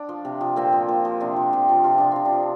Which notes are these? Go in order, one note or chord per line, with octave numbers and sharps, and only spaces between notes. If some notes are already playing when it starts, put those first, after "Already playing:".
Already playing: D4
F3
C3
F3
A#2 C4
F3
A#2
F3
C3 D4
F3
C3
F3
C3 F4
F3 D4
C3 C4
D4
F3